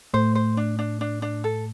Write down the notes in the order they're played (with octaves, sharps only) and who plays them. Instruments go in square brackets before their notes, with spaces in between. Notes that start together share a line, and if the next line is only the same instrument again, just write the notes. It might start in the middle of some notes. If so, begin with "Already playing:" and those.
[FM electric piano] A2 A3 [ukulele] C5
[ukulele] C5
D4
D4
D4
D4
A4